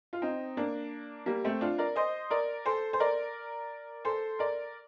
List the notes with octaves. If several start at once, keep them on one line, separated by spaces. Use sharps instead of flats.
F4
C4 D#4
A#3 D4
G3 A#3
A3 C4
D4 F4
A#4 D5
C5 D#5
A#4 D5
A4 C5
C5
A#4 D5
A4 C5
A#4 D5